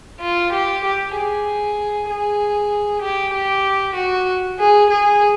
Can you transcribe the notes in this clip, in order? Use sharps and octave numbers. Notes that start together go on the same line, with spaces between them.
F4
G4
G4
G#4
G#4
G4
G4
F#4
G#4
G#4